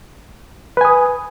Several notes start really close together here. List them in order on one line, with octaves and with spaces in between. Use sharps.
B4 G#5 D#6